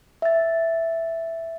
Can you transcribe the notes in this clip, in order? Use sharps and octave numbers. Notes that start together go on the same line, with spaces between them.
E5 A6